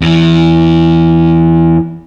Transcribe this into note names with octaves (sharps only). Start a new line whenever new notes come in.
E2 E3